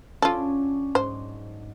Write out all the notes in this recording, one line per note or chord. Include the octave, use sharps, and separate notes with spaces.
F#3 C#4 D4 F4 A4
G#2 C5